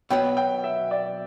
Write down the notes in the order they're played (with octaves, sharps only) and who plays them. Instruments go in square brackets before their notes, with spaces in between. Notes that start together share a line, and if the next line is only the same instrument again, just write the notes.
[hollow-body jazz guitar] B2 F#3 B3 [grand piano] G5
[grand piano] G5
E5
D5